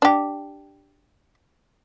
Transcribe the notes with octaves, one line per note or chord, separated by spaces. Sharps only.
D4 G4